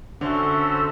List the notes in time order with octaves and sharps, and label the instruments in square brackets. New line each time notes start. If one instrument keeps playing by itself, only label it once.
[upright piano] D3 [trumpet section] C#4 F#4 A4 C5 E5